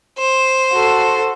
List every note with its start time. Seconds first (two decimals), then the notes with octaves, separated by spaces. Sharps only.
0.18 C5
0.72 F#4 A4